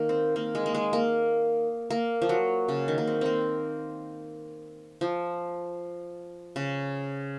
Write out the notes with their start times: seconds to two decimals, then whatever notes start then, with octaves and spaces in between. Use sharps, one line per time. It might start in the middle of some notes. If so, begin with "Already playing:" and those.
Already playing: D#3 A#3
0.09 C4
0.36 A#3
0.55 G#3
0.66 A#3
0.75 G#3
0.93 A#3
1.90 A#3
2.22 F3
2.29 F#3
2.69 C#3
2.88 D#3
2.98 A#3
3.07 C4
3.21 A#3 C4
5.01 F3
6.56 C#3